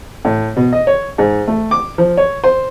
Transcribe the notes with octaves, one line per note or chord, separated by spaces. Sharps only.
A2
B2
D#5
C#5
G#2
A3
D6
F3
C#5
C5